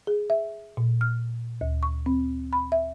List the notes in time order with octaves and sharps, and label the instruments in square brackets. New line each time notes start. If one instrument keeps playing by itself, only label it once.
[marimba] G#4
E5
A#2
F6
D2
C#6
C4
B5
E5